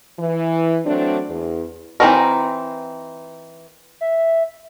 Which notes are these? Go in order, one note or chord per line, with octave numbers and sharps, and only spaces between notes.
E3
F#3 A3 C4 D4
E2
E3 A3 C4 D#4 A#4
E5